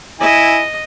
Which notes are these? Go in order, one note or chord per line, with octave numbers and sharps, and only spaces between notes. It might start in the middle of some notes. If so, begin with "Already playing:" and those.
E4 D#5 G#5